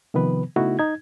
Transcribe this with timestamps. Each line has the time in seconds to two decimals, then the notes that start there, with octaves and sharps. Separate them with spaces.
0.14 C3 D#3 F3 B3 B4
0.56 C#3 A3 B3 D#4 E4 F#4
0.79 D#4 G#6